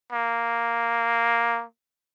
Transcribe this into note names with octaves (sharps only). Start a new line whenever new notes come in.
A#3